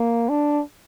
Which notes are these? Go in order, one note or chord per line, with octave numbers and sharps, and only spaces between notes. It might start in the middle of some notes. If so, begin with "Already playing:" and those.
Already playing: A#3
D4